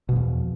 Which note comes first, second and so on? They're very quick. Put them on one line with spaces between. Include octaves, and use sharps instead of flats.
B2 F3 E2